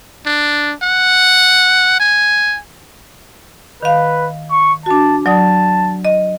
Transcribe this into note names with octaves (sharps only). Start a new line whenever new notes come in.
D4
F#5
G#5
D#3 B4 F5
C#6
D4 F#4 A5
F#3 D5 A5 D#6
D#5